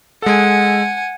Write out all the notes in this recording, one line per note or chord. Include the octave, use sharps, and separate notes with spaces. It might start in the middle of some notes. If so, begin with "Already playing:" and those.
G#3 A4 F#5 G#5